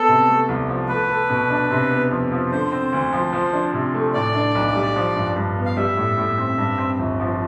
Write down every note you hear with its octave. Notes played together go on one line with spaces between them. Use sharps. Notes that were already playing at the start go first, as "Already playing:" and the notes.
Already playing: B3 A4
C3
A3
C2
F3
A3 B4
A4
B2
D4
C3
B3
F2
F3
D3 C5
C4
D2
F3
F3
D4
C3
A3
A2 D5
D4
B1
G3
F3
G2
G2
B3
F5
G3 E5
A2
A2
C4
G2
C4
G1
F3